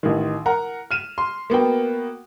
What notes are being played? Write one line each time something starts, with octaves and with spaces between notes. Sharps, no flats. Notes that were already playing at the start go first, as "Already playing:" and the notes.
A1 D#3
A#4 F#5 A#5
F6 D#7 E7
C6
A#3 B3 F#4 G5